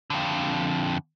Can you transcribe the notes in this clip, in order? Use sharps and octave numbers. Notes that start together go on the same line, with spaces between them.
F2 D3